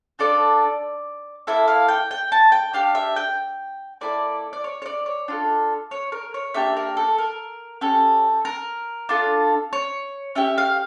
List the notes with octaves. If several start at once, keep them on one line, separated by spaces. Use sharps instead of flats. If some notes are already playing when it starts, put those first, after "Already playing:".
D4 F4 A4 D5
A#3 E4 A4 E5
F5
G5
G5
A5
G5
D4 G4 F5
E5
G5
A#3 E4 A4 D5
D5
C#5
C#5
D5
C#5
D4 F4 A4
C#5
A#4
C#5
A#3 D4 G4 E5
A#4
A4
A#4
C#4 G4 A4
A#4
D4 F4 A4
C#5
C#4 G4 E5
F5